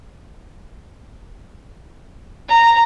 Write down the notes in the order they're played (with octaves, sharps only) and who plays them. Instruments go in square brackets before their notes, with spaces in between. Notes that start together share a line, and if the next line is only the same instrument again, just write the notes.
[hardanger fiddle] A#5